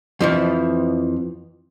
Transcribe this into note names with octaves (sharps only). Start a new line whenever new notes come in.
F2 E3 F3